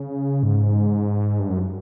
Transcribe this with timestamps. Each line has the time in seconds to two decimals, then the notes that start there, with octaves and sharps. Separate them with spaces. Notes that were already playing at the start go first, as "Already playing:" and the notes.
Already playing: C#3
0.43 G#2
1.39 G2
1.49 F#2